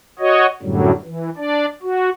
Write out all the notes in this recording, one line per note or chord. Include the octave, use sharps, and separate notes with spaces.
F#4 C#5 D#5
F#2 A2 D3 F#3 G3
E3
D4 D5
F#4